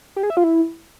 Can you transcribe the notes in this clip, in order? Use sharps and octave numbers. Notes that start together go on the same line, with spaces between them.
G4
G#4
E5
F4
E4